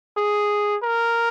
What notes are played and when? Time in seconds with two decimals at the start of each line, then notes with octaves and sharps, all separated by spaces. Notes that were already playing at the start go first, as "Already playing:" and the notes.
0.17 G#4
0.83 A#4